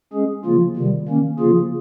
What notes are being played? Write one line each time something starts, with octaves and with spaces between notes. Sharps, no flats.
G#3 C#4 G#4
C#3 F3 A#3 F4
C3 D#3 G3
D#3 A#3 C#4
C#3 F3 A#3 F4 G#4